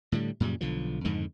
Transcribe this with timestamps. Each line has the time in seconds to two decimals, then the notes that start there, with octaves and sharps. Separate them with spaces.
0.12 A2 D3 G3
0.40 F#2 A#2 C#3 G3
0.61 B1 D3 F3
1.04 F2 G#2 D3 D#3